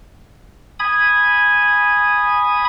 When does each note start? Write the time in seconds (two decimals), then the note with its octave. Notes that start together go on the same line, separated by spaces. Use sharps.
0.79 G#5 B5 D#6 G#6